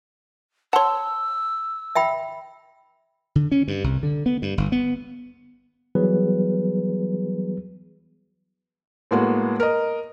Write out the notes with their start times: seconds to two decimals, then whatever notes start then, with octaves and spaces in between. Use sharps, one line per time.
0.73 C#5 F#5 A5 C6 E6
1.95 E5 G5 B5
3.36 D3
3.52 C#4
3.68 G2
3.84 C2
4.03 D3
4.26 B3
4.42 G2
4.58 G1
4.72 B3
5.95 E3 F#3 G3 B3 G#4 B4
9.11 A2 G#3 A#3 B3 F#4
9.60 A#4 D#5